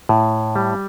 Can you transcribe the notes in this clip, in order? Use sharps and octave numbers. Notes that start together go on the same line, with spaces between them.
A2
G3